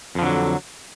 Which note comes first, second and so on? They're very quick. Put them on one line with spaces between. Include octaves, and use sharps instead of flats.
F2 F3 D3 F#3